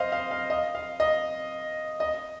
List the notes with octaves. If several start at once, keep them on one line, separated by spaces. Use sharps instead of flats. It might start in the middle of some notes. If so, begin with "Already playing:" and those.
Already playing: C5 D#5 F5
F5
F5
D#5
F5
D#5
D#5